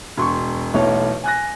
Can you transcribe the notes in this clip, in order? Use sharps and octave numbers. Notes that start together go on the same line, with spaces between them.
E1 C6 C#6
B1 E2 A3 C#5
G#5 F#6 A#6